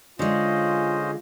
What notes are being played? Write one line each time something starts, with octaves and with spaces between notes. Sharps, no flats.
D3 G#3 C#4 F4 C5 D#5